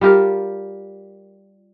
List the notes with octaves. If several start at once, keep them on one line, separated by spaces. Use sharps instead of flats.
G3 F4 G4 A#4